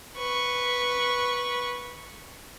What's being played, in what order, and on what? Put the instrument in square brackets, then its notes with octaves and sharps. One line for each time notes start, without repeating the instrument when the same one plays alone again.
[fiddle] B4 C#6